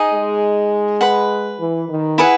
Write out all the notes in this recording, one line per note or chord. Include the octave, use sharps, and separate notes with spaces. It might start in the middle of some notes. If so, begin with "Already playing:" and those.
Already playing: D#4 G#4 D#5
G#3
B4 F#5 B5
E3
D#3
E4 G#4 B4 F#5